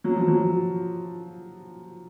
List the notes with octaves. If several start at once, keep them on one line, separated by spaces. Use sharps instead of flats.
F#3
F3
F#3